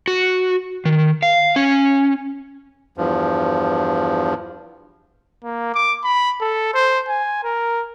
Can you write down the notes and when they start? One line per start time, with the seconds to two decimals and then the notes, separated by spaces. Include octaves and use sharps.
0.08 F#4
0.85 D#3
1.23 F5
1.56 C#4
2.98 E2 G2 F3
5.43 A#3
5.75 D6
6.04 B5
6.41 A4
6.74 C5
7.08 G#5
7.44 A#4